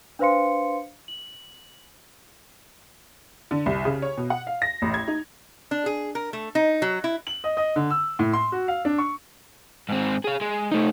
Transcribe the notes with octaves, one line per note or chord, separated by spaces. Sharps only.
D4 B4 C5 F5 C6 C#7
F#7
D3
C2
C#3
C#5
B2
F#5
F5
A#6
A1
G#6
D#4
D4
G#4
A#4
A3
D#4
F#3
E4
F#7
D#5
D#5
D3
E6
A2
C6
F#4
F5
D4
C#6
G#2 C4
G#4 F5
G#3
A3 D#4